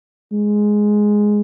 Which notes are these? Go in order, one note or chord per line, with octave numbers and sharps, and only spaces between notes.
G#3